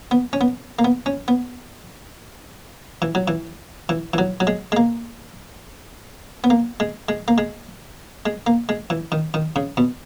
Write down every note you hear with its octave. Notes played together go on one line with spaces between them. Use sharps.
B3
C#4
B3
A#3
B3
C#4
B3
E3
F#3
E3
E3
E3
F#3
F#3
G#3
G#3
A#3
B3
A#3
G#3
G#3
A#3
G#3
G#3
A#3
G#3
E3
D#3
D#3
C#3
B2